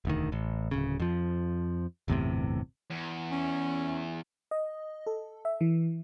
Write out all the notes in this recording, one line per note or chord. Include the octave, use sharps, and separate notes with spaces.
E1 D2 D#3
A1
D1 C#3
F2 F3
G1 E2 A2 C3
E2
C#4
D#5
A4
E5
E3